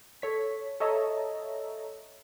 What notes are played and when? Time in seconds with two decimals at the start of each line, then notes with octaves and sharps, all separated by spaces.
0.22 A4 C#5 B6
0.80 A4 C#5 D#5 E5 A5 A#5